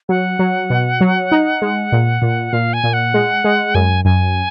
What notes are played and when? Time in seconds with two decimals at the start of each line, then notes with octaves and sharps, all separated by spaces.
0.09 F#3 F#5
0.39 F#3
0.70 B2
1.01 F#3
1.32 D#4
1.62 G#3
1.92 A#2
2.22 A#2
2.53 A#2 F5
2.73 G#5
2.84 A#2
2.93 F#5
3.14 G#3
3.44 G#3
3.75 F#2 G#5
4.05 F#2 G#5